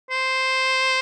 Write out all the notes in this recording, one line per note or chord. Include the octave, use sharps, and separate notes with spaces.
C5